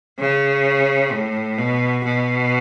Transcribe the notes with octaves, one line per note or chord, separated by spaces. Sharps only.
C#3
A2
B2
B2